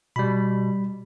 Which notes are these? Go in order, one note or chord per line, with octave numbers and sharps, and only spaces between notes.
B2 G3 B5